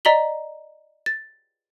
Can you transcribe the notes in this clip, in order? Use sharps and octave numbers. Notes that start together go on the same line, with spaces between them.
D5 D#5 A#5 B6 F#7 G7
A6